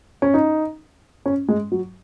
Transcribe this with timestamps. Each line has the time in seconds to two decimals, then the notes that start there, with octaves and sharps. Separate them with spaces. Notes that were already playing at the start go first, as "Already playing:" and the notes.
0.22 C#4
0.34 D#4
1.26 C#4
1.48 G#3
1.72 F#3